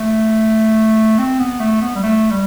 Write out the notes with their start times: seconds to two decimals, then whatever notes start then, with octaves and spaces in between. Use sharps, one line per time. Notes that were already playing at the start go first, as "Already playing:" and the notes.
Already playing: A3
1.18 C4
1.39 B3
1.60 A3
1.81 B3
1.96 G3
2.03 A3
2.31 G3